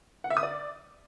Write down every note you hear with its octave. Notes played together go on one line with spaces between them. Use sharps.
F#5
E5
D#6
D5